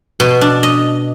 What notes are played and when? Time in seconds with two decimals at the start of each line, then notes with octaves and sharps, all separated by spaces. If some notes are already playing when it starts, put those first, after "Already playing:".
0.20 B2
0.41 D4
0.63 D#5